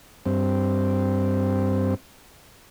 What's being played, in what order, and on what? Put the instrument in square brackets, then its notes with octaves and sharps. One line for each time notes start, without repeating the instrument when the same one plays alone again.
[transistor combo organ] G2 C4